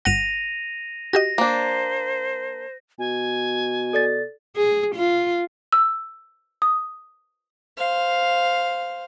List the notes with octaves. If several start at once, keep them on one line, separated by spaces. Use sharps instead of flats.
G1 F#5 A#6 D#7 F7
F#4 G4 D#5 A#6
A#3 D4 C5
B2 G#5
A4 D5 A6
G#4
F4
E6
D#6
C5 F5